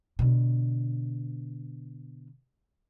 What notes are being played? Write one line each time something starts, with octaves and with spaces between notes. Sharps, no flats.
B2 D3